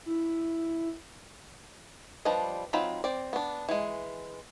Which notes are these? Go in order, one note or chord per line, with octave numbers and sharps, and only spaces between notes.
E4
F3 G3 D4 B4 D#5
F#3 C4 D#4 F4 B5
C4 D5
B3 D4
E3 G#3